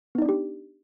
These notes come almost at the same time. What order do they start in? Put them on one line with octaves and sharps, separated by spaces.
B3 D#4 D5 D4 G4